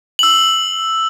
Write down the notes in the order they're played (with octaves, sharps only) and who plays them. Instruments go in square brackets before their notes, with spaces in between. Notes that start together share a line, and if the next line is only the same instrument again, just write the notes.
[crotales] E6 F#7